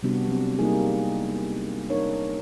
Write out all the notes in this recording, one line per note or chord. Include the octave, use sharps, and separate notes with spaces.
C3 G3 B3 D4 F#4
F#3 C4
G3 A#3 D#4 E4 G#4
D4 D#4 A#4 C#5